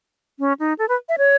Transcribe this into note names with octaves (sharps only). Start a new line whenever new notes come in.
C#4
D#4
A4
B4
E5
C#5